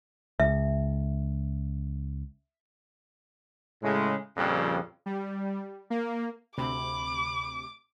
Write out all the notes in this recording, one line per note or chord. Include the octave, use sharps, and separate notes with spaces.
C#2 E5
A2 C#3 G#3
F2 A#2 C#3 F3 G3
G3
A#3
D2 C3 B5 D6